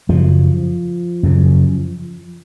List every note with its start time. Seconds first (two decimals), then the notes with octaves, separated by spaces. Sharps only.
0.09 F#2 C#3 F3
1.23 F#2 C#3